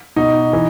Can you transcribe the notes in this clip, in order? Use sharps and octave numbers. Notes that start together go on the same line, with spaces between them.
B2 D#4
E3